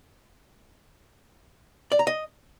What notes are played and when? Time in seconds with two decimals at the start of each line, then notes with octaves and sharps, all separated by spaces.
1.92 D5
1.99 A#5
2.07 D#5